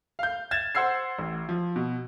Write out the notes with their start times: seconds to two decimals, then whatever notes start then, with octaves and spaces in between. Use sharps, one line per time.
0.19 F5 G6
0.51 G#6 A6 E7
0.75 C5 F#5 E6 G#6 C7
1.19 A1
1.49 F3
1.76 B2